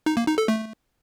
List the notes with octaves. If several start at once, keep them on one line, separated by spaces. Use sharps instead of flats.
D#4
A#3
D#4
A4
A3